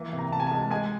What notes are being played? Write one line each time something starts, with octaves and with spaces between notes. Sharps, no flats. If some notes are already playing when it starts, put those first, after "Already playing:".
Already playing: E3 A#3
C3
A#5
C3 A5
G#5
A5
G#3
G#3 G#5